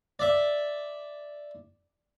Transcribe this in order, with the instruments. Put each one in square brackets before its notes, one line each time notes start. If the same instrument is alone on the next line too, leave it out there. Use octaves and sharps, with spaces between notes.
[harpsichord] D5 E5